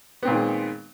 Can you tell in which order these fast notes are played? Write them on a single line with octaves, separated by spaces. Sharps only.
B3 C4 A#2 D#3 G#3